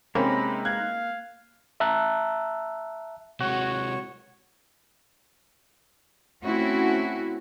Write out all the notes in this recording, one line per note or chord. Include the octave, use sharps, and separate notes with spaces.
C3 G#3 A#3 C4 C#4 D#4 B5
F5 F#6 G#6
E5 A5 A#5 E6 F#6
C3 G#3 F#4 C#5
A3 C4 C#4 E4 F#4